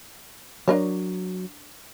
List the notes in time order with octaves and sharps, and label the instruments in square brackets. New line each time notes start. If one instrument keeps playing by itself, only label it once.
[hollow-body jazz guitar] F#3 [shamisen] D4 A#4 C#5